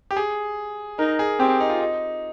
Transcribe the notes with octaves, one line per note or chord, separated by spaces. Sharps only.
G4
G#4
D#4 A#4
G#4
C4 G4
D#4
F4
D#4